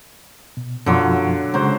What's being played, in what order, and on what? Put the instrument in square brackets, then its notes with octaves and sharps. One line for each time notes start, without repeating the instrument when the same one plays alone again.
[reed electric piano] B2
[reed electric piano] F#2 B2 F3 [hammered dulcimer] D3 F#3 F4
[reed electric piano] C#3 G#3 C#4 [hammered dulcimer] F#3 C5